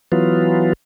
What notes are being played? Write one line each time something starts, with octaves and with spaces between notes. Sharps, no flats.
E3 F#3 B3 F4